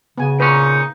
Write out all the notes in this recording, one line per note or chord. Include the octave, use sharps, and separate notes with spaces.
C#3 B3 G#5
A#2 C#4 D#4 B4